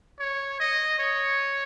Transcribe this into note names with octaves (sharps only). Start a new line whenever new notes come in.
C#5
D#5
C#5